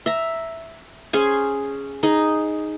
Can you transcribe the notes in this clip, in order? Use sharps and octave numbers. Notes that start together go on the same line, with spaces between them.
E5 A#5
C#4 G#4 C5 G#5
D#4 G#4 D#5